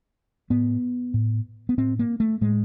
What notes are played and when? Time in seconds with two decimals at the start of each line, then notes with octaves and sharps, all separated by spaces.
0.50 A2 B3
1.14 A2
1.69 B3
1.78 A2 C4
1.99 A#3
2.20 A3
2.41 A2 G#3